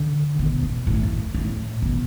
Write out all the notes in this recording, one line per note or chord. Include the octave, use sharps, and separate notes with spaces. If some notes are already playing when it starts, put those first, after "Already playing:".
Already playing: D3
B2
B2
A2
F#2
A2
B2